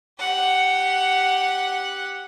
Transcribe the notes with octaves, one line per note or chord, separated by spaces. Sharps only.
G4 F#5